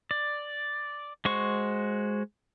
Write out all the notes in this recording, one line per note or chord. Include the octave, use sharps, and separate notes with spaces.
D5
G#3 F#4 C5 C#6